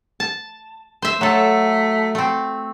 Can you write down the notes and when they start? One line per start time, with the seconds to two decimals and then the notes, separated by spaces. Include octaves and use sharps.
0.20 A5
1.02 C5 E5
1.21 F#3 A3 A4
2.15 A3 C4